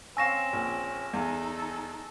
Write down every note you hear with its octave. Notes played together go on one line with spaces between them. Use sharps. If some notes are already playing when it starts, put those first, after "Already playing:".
C4 C#4 F5 G#5 C#6 E6 A#6 E7
A#1
E2 D#4 A4